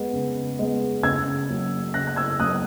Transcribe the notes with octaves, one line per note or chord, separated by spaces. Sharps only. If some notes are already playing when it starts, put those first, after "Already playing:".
Already playing: G#3 B3
C#3
G#3 B3
C#3 E6 G#6
F#3 A#3 C#4
C#3 F#6 A#6
F#6
E6 G#6
F#3 A#3 C#4 D#6 F#6